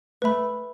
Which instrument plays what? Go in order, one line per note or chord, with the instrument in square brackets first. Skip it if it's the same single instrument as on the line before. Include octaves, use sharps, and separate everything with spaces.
[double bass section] A3 [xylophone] B4 E5 B5